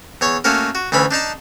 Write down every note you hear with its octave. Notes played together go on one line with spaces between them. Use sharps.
E2 C#5 C#6
A3 A#3 C#4 F#4 A#4
F#4
D2 E3 C#4 B5
D4 D#4 A5 A#5